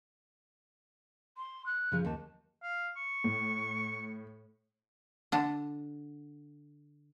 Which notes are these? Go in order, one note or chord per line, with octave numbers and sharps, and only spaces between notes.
C6
F#6
C#3 F3 G#4
D#2 A5
F5
C#6
A2
D3 D4